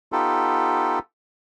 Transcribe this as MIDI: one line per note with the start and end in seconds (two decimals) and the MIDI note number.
0.12 0.99 59
0.12 0.99 63
0.12 0.99 65
0.12 0.99 67
0.12 0.99 69